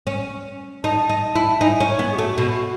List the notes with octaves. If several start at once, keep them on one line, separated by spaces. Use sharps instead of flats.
C#4
D#4 A5
D#4
E4
D#4 G#5
C#4
C#5
B3
G#4
A3 F#4
B2